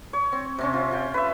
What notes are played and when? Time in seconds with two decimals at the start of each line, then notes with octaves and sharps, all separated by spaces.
0.13 C#5
0.33 C4
0.59 C3 C4 C#4
0.74 F4
0.91 F4 C#5 G5
1.14 B4 E5